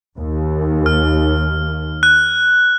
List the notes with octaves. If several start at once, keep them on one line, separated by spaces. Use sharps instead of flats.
D#2
F6
F#6